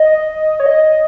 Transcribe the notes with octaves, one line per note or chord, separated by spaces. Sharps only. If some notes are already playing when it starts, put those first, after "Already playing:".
Already playing: D#5
C#5
D#5